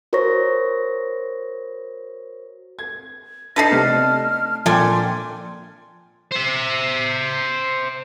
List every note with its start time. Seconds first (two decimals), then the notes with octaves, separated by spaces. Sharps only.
0.13 F#4 A#4 C5 C#5 C#6 A#6
2.79 G#6
3.56 D4 D#4 A4 B4 A5 A#6 C7
3.72 C3 A3 B3 F6
4.66 A#2 F3 D4 A4 G5 G#5 C6
6.32 C5 E5